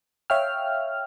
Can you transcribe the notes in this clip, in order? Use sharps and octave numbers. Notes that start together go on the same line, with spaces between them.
C#5 E5 F5 G5 F6